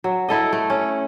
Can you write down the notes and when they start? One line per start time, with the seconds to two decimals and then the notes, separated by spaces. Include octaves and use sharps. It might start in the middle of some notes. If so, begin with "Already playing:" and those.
0.04 F#3
0.29 E4 A4 D#5
0.53 A3
0.70 C#4